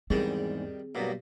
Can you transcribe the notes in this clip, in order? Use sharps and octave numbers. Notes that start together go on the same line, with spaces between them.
E2 G#2 D#3 G3 C4 G#4
G2 B2 F#3 A#3 B3